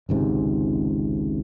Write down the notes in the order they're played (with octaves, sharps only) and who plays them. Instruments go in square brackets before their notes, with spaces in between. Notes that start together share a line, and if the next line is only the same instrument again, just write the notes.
[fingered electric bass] G#1 C#2 G#2 C3